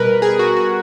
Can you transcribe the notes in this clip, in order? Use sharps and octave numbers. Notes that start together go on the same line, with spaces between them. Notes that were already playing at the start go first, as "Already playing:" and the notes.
Already playing: B2 G3 A#4 B4
G#4
F#4
F#4